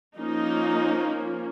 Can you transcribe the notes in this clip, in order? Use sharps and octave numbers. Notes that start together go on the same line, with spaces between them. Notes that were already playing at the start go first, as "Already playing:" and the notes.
F3 A#3 C#4 D#4